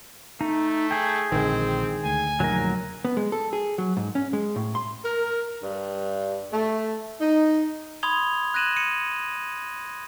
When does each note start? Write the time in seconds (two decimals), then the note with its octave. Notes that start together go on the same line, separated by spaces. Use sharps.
0.41 A3 D#4
0.91 G#4 G5
1.32 A#1 D3 D#3 G#3 C4
2.05 D2 G#5
2.40 F1 A#1 D#3 F#3 A#4
3.05 B3
3.17 G#3
3.32 A4
3.53 G#4
3.78 F#3
3.97 G#2
4.15 C#4
4.33 G#3
4.56 A2
4.75 C6
5.05 A#4
5.62 G2
6.52 A3
7.20 D#4
8.03 B5 C6 D#6 G#6 F7 G7
8.54 F#6 G#6 A#6 D#7 E7 F#7
8.76 D#6 C#7 D#7